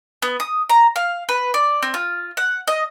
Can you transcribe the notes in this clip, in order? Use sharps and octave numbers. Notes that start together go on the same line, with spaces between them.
B3
D#6
A#5
F5
B4
D5
C4
F4
F#5
D#5